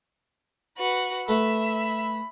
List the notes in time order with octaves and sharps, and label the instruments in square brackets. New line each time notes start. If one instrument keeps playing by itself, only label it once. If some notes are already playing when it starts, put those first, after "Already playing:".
[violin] F#4 B4
[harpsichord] A3 A4 B4 [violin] E5 [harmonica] B5